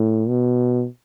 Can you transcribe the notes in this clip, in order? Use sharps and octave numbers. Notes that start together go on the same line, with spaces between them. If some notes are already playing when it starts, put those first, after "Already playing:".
Already playing: A2
B2